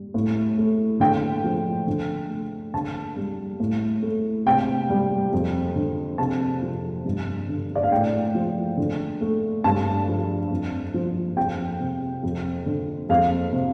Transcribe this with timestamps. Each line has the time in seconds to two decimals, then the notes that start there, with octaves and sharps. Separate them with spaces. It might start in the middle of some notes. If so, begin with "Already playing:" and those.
Already playing: G3
0.14 A2
0.58 A3
1.00 D3 G5
1.44 F3
1.87 D3
2.30 A3
2.74 D3 A5
3.16 G3
3.60 A2
4.03 A3
4.46 C3 G5
4.90 G3
5.33 F2
5.76 D3
6.18 C3 A5
6.62 F3
7.05 G2
7.49 D3
7.75 D5
7.83 F5
7.91 A2 G5
8.35 F3
8.77 D3
9.21 A3
9.64 G2 A5
10.08 F3
10.51 F2
10.94 F3
11.37 F2 G5
11.80 C3
12.23 F2
12.66 D3
13.09 F2 F5
13.53 C3